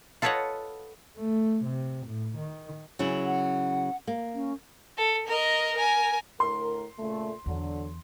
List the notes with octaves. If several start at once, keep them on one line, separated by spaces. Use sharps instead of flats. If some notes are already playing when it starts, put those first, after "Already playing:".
F4 A4 B4 C#5 D#5 F#5
A3
C3
A2
D#3
C#3 F#3 E4
F#5
A#3
C#4
A4
A#4 D#5
A#4 G#5
A2 D3 A#4 C6
A#2 C#3 A3
E2 D3 F#3